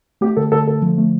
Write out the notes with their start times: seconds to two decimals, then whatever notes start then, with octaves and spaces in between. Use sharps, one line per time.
0.21 A3 G4
0.37 D3 A4
0.52 D3 A4
0.67 D3 A4
0.82 F3
0.98 A3